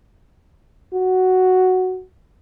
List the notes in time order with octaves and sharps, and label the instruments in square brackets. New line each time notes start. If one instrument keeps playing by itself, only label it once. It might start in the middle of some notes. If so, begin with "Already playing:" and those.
[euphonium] F#4